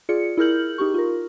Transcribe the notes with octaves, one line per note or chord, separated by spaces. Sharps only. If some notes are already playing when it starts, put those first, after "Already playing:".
F4 G#4 D5 C#7
E4 G#4 A#4 F6 G6 F#7
D#4 G4 C#6
F4 A#4